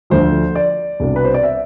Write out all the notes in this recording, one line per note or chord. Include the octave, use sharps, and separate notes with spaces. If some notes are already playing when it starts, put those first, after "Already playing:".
D2 D3 F3 C5
D5
C2 B2 B3 D4
B4
C5
D5
E5